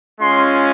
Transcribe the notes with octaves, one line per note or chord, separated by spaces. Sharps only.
G#3 C#4 F4 C6